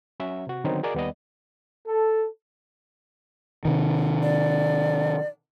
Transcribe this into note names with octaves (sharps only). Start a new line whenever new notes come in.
F#3 C#4 F#4 E5
C3 F#4
D3 D#3 F#3 B3 C4 D#4
F#4 G#4 A#4 D5 D#5 D6
D#2 G3 B3 D5 D#5
A4
C3 D#3
D5